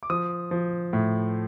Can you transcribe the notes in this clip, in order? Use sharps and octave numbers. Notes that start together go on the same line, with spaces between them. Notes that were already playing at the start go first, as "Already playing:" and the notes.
D6
F3 D#6
F3
A2